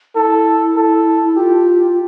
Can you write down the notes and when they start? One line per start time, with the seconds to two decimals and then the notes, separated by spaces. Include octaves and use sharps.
0.15 E4 A4
0.76 A4
1.36 F4 G4